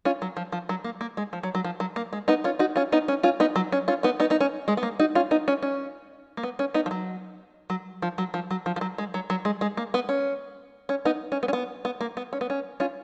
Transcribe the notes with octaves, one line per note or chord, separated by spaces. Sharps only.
C#4 F4
F#3
F3
F3
F#3
A#3
A#3
G#3
F3
F#3
F#3
F3
F#3
A#3
G#3
B3 D#4
C#4 F4
D#4 F#4
C#4 F4
B3 D#4
C#4
C#4 F4
B3 D#4
F#3
C#4
C#4 F4
B3 D#4
B3 D#4
B3 D#4
C#4
G#3
B3
A#3
D#4 F#4
C#4 F4
B3 D#4
C#4
C#4
A#3
B3
C#4
B3 D#4
F3
F#3
F#3
F3
F#3
F3
F#3
F3
F3
F#3
G#3
F#3
F#3
G#3
G#3
A#3
B3
C#4
C#4
B3 D#4
C#4
B3
C#4
B3
B3
A#3
B3
C#4
B3
C#4
C#4 F4